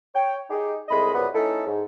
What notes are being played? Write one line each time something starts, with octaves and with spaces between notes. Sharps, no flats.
C#5 G5
D#4 G4 G#4
C2 G#3 A3 D#5 B5
C#2 F#2 C3 G3 B3
A3 C#4 D#4 E4 A4
G#2